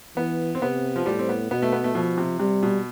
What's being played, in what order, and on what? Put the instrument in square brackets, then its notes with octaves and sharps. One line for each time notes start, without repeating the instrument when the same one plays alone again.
[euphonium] E3 [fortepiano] B3
[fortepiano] C4
[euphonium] C3 [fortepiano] B3
[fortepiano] F3
[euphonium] A2 [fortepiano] G3
[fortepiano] C4
B3
[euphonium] B2 [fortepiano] B3
[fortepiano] A3
B3
A3
[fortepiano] B2 [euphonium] F3
[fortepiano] C3
[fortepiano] C3 [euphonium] G3
[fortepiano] B2